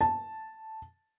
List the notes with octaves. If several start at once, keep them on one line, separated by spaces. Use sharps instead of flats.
A5